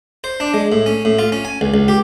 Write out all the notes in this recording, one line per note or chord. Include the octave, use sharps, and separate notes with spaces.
C5
D4
G#3
A2
C#4
A2
F4
C#4
G#5
C#2
C#2
G4